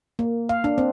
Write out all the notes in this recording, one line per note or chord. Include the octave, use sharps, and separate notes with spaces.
A#3
F5
D4
C4